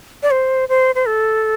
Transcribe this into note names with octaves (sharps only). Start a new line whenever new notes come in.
D5
C5
C5
C5
A4